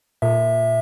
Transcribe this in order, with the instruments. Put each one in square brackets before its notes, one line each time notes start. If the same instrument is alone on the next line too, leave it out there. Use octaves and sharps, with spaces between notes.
[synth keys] A#2 [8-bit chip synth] E5